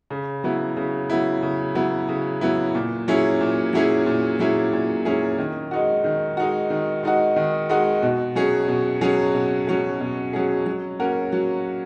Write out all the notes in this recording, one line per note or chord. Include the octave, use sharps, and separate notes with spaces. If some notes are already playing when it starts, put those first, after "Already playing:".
C#3
F#3 B3 E4
C#3
F#3 B3 E4
C#3
F#3 B3 E4
C#3
F#3 B3 E4
A#2
F#3 C#4 E4 G#4
A#2
F#3 C#4 E4 G#4
A#2
F#3 C#4 E4 G#4
A#2
F#3 C#4 E4 G#4
D#3
G#3 D#4 F#4
D#3
G#3 D#4 F#4
D#3
G#3 D#4 F#4
D#3
G#3 D#4 F#4
B2
F#3 C#4 G#4
B2
F#3 C#4 G#4
B2
F#3 C#4 G#4
B2
F#3 C#4 G#4
F#3
A#3 C#4 F#4 A#4
F#3